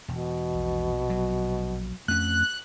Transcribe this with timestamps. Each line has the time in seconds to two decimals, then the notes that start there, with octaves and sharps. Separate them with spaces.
0.08 E1 B2
0.54 A#1
1.10 F#3
2.08 F2 A3 C#4 F#6